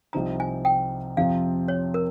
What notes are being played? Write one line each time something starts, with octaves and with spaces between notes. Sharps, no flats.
C2 C3 F3 C4 D#4 A#5
G#5
G5
F2 C3 F3 C4 F5
C#5
A#4